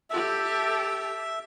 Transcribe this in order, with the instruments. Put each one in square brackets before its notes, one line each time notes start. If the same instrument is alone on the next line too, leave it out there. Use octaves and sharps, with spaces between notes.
[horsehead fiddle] G4 A4 [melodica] E5